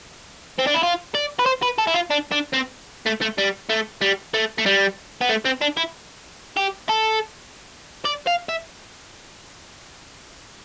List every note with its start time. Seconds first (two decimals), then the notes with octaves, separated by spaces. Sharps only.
0.59 C4
0.67 D4
0.75 E4
0.83 F4
1.15 D5
1.39 B4
1.46 C5
1.63 B4
1.78 A4
1.87 E4
1.94 F4
2.11 D4
2.32 D4
2.54 C4
3.06 A3
3.22 A3
3.38 G3
3.70 A3
4.02 G3
4.34 A3
4.58 A3
4.66 G3
5.21 B3
5.29 A3
5.45 C4
5.61 D4
5.77 E4
6.57 G4
6.89 A4
8.05 D5
8.27 F5
8.49 E5